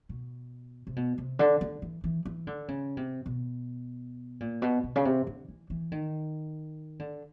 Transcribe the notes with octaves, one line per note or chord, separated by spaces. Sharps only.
B2
C3
B2
C3
D3
D3
E3
E3
E3
D3
C#3
C3
B2
A#2
B2
B2
C#3
C3
D3
E3
E3
D#3
D3